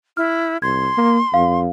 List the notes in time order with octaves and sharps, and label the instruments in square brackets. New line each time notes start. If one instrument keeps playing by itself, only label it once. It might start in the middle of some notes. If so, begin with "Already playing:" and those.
[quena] E4 [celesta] F6
[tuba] C2 [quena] C6 [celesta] G#6
[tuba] A#3
[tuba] F2 [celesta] F5